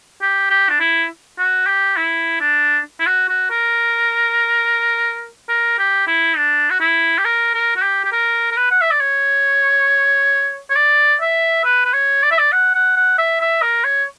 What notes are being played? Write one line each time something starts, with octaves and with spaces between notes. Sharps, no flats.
G4
G4
D4
E4
F#4
G4
E4
D4
E4
F#4
F#4
A#4
A#4
G4
E4
D4
F#4
E4
G4
A#4
A#4
F#4
G4
G4
A#4
A#4
B4
F#5
E5
D5
C#5
C#5
D5
E5
B4
B4
C#5
D5
E5
D5
F#5
F#5
F#5
E5
E5
A#4
C#5